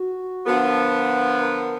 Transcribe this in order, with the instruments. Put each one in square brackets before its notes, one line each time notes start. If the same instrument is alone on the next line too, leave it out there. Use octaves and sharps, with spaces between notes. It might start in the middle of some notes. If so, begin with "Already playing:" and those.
Already playing: [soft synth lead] F#4
[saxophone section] D3 F3 B3 [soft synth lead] A#4
[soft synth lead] A#4